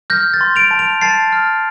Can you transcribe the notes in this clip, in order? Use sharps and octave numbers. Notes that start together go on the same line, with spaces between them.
F6 G6 A#6
A6
C6
D7 F7
A5
D7 F7
A5 A6 C7
F6